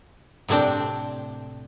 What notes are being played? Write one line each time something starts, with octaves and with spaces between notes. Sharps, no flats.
A2 C3 C4 D4 G5